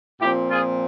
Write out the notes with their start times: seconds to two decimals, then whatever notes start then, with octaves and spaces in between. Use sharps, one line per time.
0.20 A#2 F3 C4 E4 G4
0.50 F4 G#4